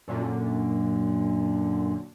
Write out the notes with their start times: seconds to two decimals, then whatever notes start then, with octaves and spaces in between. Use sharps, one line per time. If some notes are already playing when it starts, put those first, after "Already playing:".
0.08 F#2 A#2 D3